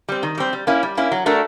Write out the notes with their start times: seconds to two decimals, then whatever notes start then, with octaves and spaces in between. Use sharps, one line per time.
0.08 G3 C4
0.23 D#3
0.37 G3 C4
0.53 G3
0.67 A#3 C#4 E4
0.83 G3
0.97 A#3 C#4 E4
1.11 F#3
1.26 A3 D4 F#4 A#4